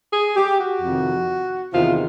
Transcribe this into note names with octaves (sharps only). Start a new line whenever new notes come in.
G#4
G4
F#4
F2 C3 D#3
E2 C3 D#3 F4